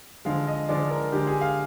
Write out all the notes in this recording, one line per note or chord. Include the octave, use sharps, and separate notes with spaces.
D3 F3 G#3 F5
D#5
D3 F3 G#3 D5
A#4
D3 G#3 G4
G#4
F5